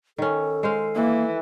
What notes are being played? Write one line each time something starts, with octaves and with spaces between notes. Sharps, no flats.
D#3 C#4 A4
G#3 C5 F5
E3 A#3